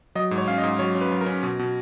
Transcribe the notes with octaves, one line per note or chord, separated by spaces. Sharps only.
F#3 D#5
G#2
C#5
C#4 F5
D#5
G#2
F#3 C#5
C#4
B4
F#3
A#4
C#4
B2
B2